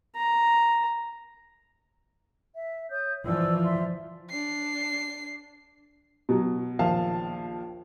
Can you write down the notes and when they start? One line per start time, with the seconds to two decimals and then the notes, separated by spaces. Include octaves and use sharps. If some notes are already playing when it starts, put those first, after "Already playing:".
0.16 A#5
2.55 E5
2.91 C#5 D#6 G6
3.26 E3 F3 D5 E6
3.63 D5 E5 C6
4.30 D4 C7
6.29 B2 F#3
6.79 A#1 D#2 F3 F5 A5